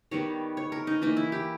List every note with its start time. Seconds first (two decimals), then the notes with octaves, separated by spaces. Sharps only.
0.11 D#3 G3 B3 C#5
0.57 C#5
0.72 A#4
0.87 D#4
1.02 E3 A#3 D#4
1.17 E4
1.32 G4